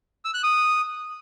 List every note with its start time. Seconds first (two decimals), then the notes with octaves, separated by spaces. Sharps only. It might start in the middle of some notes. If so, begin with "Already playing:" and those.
0.25 E6
0.34 F#6
0.43 D#6